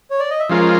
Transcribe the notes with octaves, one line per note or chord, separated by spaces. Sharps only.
C#5
D5
D#5
E5
F3 G#3 C#4 F4 A#4 F5